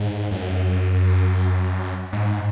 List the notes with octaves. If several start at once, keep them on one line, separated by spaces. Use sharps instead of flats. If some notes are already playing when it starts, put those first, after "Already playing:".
Already playing: G#2
F#2
G#2